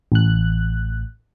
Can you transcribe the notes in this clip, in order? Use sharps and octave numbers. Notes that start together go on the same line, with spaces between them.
A1 F#6